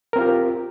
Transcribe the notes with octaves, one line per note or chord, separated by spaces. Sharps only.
C4 F4 G4 A#4